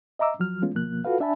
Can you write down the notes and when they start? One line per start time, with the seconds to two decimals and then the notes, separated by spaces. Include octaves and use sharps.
0.19 D#5 E5 A#5 D6 E6
0.39 D#2 F3 F#3 F6
0.62 E3 G#3 A3 B3 C#4 F4
0.75 D2 B2 F3 A#3 F#6
1.05 F4 F#4 A4 B4 F5
1.20 D4 E5 G#5 A5 B5